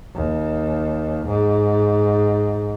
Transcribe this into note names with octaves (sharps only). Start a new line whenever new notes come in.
D#2
G#2